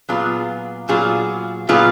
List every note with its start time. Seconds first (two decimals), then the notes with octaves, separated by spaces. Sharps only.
0.09 A#2 F#3 B3 F4 G#4
0.89 A#2 F#3 B3 F4 G#4
1.69 A#2 F#3 B3 F4 G#4